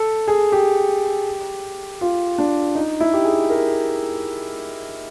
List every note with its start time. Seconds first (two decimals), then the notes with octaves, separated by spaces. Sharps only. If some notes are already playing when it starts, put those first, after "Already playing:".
Already playing: A4
0.28 G#4
0.52 G4
2.01 F4
2.38 D4
2.75 D#4
3.00 E4
3.13 G4
3.24 G#4
3.50 A#4